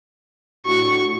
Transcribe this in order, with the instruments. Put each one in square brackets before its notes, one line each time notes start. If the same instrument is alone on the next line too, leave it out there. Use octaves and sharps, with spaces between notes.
[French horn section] A2 D4 F#4 [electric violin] C#6